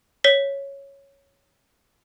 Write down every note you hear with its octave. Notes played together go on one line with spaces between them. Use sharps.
C#5 B6 G7